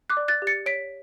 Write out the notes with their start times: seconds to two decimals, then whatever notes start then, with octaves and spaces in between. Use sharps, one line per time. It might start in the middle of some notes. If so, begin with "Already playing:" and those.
0.10 D6 F#6
0.17 D5
0.28 F#6 A6
0.42 G4
0.47 A6 C#7
0.66 C#5 B6 D7